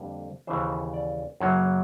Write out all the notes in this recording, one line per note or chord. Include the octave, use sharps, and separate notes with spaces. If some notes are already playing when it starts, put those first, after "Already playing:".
Already playing: F2 D3 G3 A#3
D#2 C#3 E3 C5
D5
F#2 C#3 F#3 A#3 C#5